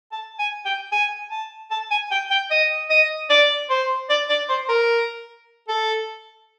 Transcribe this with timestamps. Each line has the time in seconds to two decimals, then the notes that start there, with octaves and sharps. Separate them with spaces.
0.12 A5
0.39 G#5
0.65 G5
0.92 G#5
1.31 A5
1.71 A5
1.90 G#5
2.11 G5
2.30 G5
2.51 D#5
2.90 D#5
3.30 D5
3.70 C5
4.10 D5
4.29 D5
4.49 C5
4.69 A#4
5.68 A4